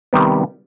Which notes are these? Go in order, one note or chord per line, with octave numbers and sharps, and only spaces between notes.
C3 D#3 G3 B3 G4